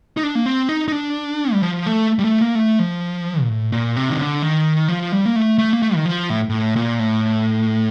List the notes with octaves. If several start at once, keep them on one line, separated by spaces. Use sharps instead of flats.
D#4
D4
A#3
C4
D#4
D#4
D4
G3
F3
A3
G3
A3
A#3
A3
F3
A#2
A2
A#2
C3
D#3
D3
D#3
F3
G3
A#3
A3
A3
A#3
A3
D#3
F3
A2
A2
A#2
A2